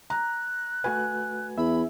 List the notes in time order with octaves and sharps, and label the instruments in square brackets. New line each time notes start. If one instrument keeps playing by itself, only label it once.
[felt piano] A#5 [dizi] F#6
[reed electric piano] A3 F#4 B4 [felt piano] G#5
[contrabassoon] E2 [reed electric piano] E5 [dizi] B5